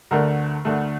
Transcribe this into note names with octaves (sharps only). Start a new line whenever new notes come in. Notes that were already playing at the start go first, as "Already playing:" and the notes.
D2 D3 A3 A#4
D2 D3 A3